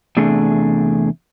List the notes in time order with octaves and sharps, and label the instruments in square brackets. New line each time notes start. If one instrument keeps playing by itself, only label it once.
[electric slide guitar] E2 C3 A3 D4 G#4